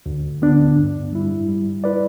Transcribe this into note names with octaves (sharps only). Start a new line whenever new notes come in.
D2
D3 B3 D4
G2
G3 E4
G3
E4 B4 D5